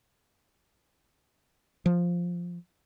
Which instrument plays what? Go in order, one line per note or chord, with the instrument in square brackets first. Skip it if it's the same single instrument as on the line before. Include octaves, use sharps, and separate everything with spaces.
[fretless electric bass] F3